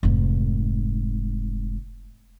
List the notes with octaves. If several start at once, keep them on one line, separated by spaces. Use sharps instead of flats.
F1 G#2